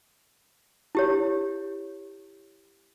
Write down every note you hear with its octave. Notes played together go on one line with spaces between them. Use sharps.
E4 G4 C#5